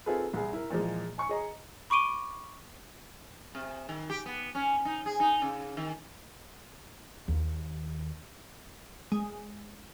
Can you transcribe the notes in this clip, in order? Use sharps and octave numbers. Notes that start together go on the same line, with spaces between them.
C4 D#4 F4 G#4 A4 B4
C2 G#4
E4 A#4
A#2 E3 F3 G#3
G#5 C#6 C#7
G#4 D#5 A#5
B5 C#6 D6 D7 D#7 G7
C3
D#3
G4
B3
C#4
D#4
G#4
D#4
C#3
D#3
D#2
G#3